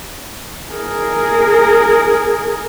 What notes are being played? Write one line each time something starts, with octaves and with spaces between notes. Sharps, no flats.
G#4 A#4